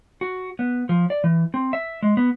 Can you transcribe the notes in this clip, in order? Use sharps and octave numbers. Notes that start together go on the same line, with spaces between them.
F#4
B3
F3
D5
E3
C4
E5
G#3
B3